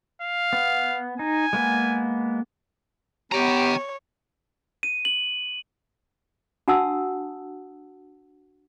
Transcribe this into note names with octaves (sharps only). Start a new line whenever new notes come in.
F5
B3
D#4 G#5
G#3 A#3 B3
B3 G4 C#5 G5 A#5
D#7
F#7
D4 F#4 F#5 A5 D#6 E6